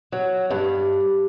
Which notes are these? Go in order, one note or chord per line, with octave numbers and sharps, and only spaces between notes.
F#3
G2